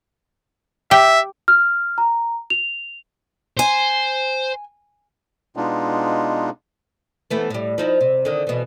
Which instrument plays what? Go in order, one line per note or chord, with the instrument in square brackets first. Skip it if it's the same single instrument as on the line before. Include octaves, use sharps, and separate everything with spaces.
[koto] G4 G5 [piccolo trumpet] E5
[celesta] F6
A#5
F7
[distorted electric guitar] C5 [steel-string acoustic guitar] G#5
[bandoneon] B2 G#3 B3 D4 D#4 F4
[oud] E3 A3 B3
A2 G3
F3 D#4 E4
C3
D3 D#3
B2 E3